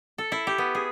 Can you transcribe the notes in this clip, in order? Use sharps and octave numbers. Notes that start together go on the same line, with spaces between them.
A4
E4
G4
B3
G#4